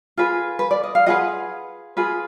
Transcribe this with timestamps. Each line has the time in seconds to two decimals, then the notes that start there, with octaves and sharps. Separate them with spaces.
0.17 F4 G#4 B4
0.59 B4
0.71 D5
0.83 D#5
0.95 F5
1.06 F4 G#4 B4 D#5 F#5
1.97 F4 G#4 B4